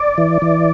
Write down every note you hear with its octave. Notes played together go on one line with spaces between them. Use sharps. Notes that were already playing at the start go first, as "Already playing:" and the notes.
Already playing: D5
E3
E3